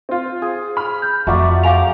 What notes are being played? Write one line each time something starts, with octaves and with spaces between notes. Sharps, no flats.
C4 F4
G#4
B5 F6
G6
F2 A3 F4 F#4 D5 E5 A#5
F5 G#5 A#5 C6 D6 F7